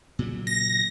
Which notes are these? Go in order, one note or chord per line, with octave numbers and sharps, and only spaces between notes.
A#2 C#3 F#3
A#6